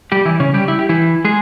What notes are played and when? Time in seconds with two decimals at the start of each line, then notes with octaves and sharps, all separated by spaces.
0.12 G3 G4
0.25 E3 E4
0.40 C#3 C#4
0.54 G3 G4
0.68 E4
0.79 G4
0.89 E3 E4
1.25 G#3 G#4